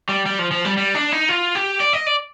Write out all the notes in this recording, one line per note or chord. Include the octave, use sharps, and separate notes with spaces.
G3
G3
F3
F3
G3
G3
D4
D#4
F4
G4
D5
D#5
D5